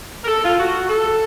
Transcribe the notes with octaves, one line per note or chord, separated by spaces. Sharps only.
A#4
A4
F4
F#4
A4